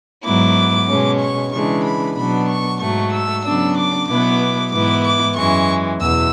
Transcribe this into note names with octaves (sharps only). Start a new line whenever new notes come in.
G#2 F#3 B3 E4 D6
B2 G#3 C#4
C#6
C#3 E3 G#3 D4 C#6
B5
B2 F#3 B3 D4 B5
C#6
G#2 F#3 A3 C#6
E6
C#3 F#3 B3 D4 E6
D6
B2 F#3 B3 E4 D6
G#2 E3 B3 E4 D6
D6
F#2 E3 G#3 C#6
E2 B2 E6